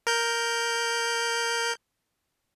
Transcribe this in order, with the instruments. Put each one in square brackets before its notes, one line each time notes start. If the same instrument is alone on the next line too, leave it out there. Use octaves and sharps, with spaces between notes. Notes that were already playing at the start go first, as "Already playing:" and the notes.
[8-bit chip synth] A#4 G6